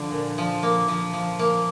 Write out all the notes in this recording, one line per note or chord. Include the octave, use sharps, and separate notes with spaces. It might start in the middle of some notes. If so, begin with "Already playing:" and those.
Already playing: D3 F3
A#2
F3
A#3
F3
F3
A#3